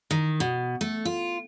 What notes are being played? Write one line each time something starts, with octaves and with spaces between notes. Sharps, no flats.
D#3
B2
A3
F4